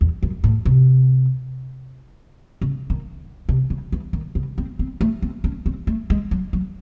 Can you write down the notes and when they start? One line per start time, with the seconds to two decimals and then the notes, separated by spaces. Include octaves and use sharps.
0.01 E2
0.23 F#2
0.44 A2
0.65 C3
2.61 C#3
2.90 D#3
3.49 C3
3.70 C#3
3.92 E3
4.13 D#3
4.35 C#3
4.58 C4
4.79 C4
5.01 A3
5.22 C4
5.44 C#4
5.66 C4
5.87 A3
6.10 G#3
6.31 F#3
6.53 F#3